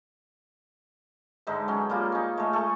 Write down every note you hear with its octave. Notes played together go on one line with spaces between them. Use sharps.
G#2 D3 D#4 E5
F#3 C#4
G3 A#3 F4
C#4 D#4
G#3 A3
A3 A4 G#5 C#6